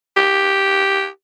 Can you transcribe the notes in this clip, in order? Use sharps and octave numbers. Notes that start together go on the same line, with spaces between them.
G4